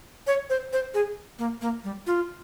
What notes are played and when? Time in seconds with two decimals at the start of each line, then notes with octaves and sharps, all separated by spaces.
0.27 C#5
0.50 C5
0.73 C5
0.94 G#4
1.39 A#3
1.62 A#3
1.84 G3
2.07 F4